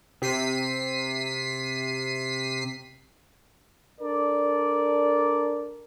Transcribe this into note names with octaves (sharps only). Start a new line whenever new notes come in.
C3 B6 C7 D#7
D4 A4 A#4 D5